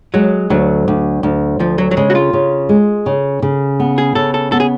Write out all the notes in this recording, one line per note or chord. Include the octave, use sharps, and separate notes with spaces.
F#3 G#3
D2 F#3
D2
D2
D2 F3
F#3
F#3
C#3 G#3
F#4
F4
C#3
G#3
C#3
C#3
B3
G#4
C#3 A4
A4
B3 A4
G#4